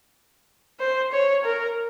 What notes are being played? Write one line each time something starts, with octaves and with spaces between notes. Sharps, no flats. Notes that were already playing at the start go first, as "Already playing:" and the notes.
C5
C#5
A#4